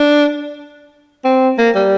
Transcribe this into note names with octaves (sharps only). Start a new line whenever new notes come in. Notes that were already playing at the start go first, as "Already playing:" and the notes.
Already playing: D4
C4
A#3
G3